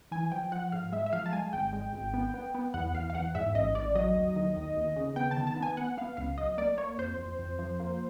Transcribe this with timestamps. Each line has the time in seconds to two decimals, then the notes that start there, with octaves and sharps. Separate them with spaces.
0.11 E3 G#5
0.32 F3 G5
0.52 F3 F#5
0.72 G#2 F5
0.92 G#3 E5
1.06 E5
1.13 F3 F5
1.26 A5
1.33 G#3 G#5
1.53 G#1 G5
1.73 G#3
1.93 G#1
2.14 B3
2.34 B3
2.54 B3
2.74 E2 F#5
2.94 E2 F5
3.10 F5
3.15 E2 F#5
3.35 G#2 E5
3.55 A1 D#5
3.75 A1 D5
3.95 F#3 D#5
4.15 D#2
4.36 D#3
4.56 D#2
4.77 D#2
4.96 C#3
5.16 B3 G5
5.31 A5
5.36 D#3
5.47 A5
5.56 B3
5.62 G#5
5.77 B3 F#5
5.98 B3 F5
6.17 C#2 F5
6.38 B1 D#5
6.58 A#3 D5
6.78 A#3 C#5
6.98 F2 C5
7.18 F2
7.39 F2
7.59 F3
7.80 A#3